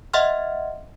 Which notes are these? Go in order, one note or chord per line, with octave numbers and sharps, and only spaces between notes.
D#5 E5 F#5 C6 F6